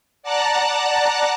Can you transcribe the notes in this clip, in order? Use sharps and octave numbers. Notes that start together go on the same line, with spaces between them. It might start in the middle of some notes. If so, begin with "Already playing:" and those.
D5 F#5 A5 A#5 F#6